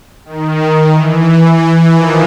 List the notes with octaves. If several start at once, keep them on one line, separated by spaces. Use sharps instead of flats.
D#3
E3
D#3 F3